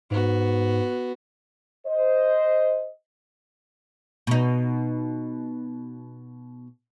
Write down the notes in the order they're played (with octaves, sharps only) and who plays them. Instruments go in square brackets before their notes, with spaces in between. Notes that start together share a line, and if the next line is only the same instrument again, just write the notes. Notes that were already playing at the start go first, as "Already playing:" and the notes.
[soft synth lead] G#2 [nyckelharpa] B3 F#4
[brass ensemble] C5 D#5
[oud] B2 D#4